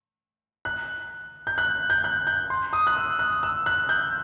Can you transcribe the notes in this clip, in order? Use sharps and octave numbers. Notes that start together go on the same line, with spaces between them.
F#6
G6
F#6
G6
F#6
G6
C6
D#6
F#6
E6
F#6
E6
F#6
G6